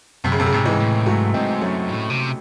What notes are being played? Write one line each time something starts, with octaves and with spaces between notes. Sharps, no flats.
F#2 C3
C#3
C3
C#3
G#2 C3
E3 G#3
A2
G#2 F#3 A3
G#2 C4 D#4
F#2 A3 C#4
A2
C3